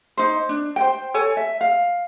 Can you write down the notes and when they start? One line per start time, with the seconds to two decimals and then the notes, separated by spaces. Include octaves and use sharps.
0.17 D#4 C5
0.49 D4
0.76 C5 G5
1.14 A4 C#5 G#5
1.37 E5
1.61 F5